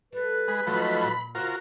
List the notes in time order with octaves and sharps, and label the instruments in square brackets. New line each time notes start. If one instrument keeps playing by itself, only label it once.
[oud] G3 A4 [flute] B4
[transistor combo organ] G#3 [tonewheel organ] B5
[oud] D#3 G#3 D#4 [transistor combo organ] F3 F#3 A3
[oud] A#2
[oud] C#3 C5 F5 [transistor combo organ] F4 F#4 A#4